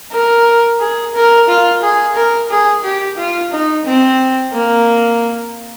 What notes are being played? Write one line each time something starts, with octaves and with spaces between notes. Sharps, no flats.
A#4
G#4
A#4
F4
G#4
A#4
G#4
G4
F4
D#4
C4
A#3